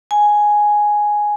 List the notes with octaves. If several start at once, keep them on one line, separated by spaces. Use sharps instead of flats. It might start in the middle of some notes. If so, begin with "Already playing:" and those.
G#5